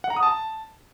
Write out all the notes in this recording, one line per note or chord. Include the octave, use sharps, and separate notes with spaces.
F#5
A#5
D#6
A5